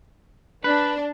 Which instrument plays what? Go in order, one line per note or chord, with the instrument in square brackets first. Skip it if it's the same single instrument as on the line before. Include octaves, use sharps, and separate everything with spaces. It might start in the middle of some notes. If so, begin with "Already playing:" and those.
[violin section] D4 [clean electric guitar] B4